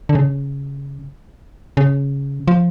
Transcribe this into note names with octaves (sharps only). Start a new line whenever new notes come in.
D3
C#3
C#3
F3